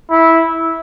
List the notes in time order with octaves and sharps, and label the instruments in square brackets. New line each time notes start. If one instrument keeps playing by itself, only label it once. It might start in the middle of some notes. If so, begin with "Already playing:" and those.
[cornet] E4